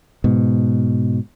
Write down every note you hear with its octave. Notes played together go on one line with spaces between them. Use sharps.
G#2 B2